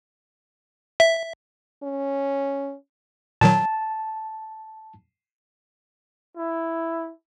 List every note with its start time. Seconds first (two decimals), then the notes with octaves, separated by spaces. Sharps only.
1.00 E5
1.83 C#4
3.41 A#2 D#3 F#3 A5
6.37 E4